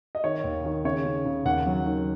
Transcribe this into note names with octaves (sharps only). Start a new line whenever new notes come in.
D#5
D#3 C#5
D#2
D#3
C#3 C#5
C#3
C#3
D#2 F#5
F#3
D#3